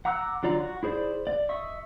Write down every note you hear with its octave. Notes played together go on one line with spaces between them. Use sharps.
F#5 A#5 D6 E6 F#6
D3 F#3 F4 D5 A#5
F#4
E4 G#4 C5 D5
D5
D#5 E5 C#6